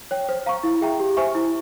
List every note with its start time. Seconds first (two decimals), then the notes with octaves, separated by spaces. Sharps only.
0.11 C#5 G5
0.29 C5
0.46 F5 A#5 C#6
0.63 E4
0.81 G#4 E5 G5 A#5
1.00 G4
1.17 C5 E5 G#5 C#6
1.35 E4